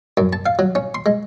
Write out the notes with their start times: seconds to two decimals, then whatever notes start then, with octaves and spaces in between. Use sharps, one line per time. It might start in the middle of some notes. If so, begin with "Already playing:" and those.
0.17 F#2
0.33 A5
0.46 F5
0.59 F#3
0.75 C#4
0.95 C6
1.06 G#3